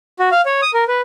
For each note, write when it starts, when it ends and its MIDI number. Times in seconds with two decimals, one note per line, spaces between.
0.19 0.29 66
0.32 0.41 77
0.45 0.61 73
0.62 0.71 87
0.74 0.84 70
0.88 1.01 71